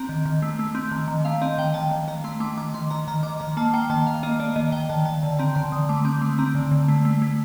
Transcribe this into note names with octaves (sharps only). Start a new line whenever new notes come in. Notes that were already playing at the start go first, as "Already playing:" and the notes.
Already playing: C4 A#5
D#3
D#3
A3
A3
C4
D#3
D#3
A3 F5
C4 D#5
D#3 G5
D#3 A5
D#3
D#3 A#5
A3 C6
A3 D6
D#3 D6
D#3 C6
D#3 A#5
D#3 A#5
D#3 D6
D#3 A#5
A#3 A5
A#3 G5
D#3 A5
D#3 F5
A#3 D#5
A#3 D5
D#3 D#5
D#3 G5
D#3 A5
D#3 A5
D3 A5
C4 A#5
D3 C6
D3 D#6
A3 D6
C4 D6
A3 C6
C4 A#5
D3
D3
A3
A3
A3